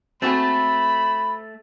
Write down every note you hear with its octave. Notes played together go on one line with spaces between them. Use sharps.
A3 C4 F#4 G#4 A4 B5